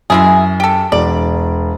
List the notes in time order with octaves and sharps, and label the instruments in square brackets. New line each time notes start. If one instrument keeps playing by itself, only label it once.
[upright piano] F#2 [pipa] G#3 E4 G#4
[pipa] G4 A4
[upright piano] E1 [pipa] D5